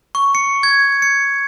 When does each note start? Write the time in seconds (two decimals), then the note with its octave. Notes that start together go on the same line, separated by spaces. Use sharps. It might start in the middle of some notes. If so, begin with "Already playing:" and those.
0.15 C#6
0.35 C#7
0.63 G#6
1.02 C#7